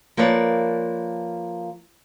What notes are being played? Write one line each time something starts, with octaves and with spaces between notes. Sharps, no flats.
F3 A#3 A#4 B4 C#5 D5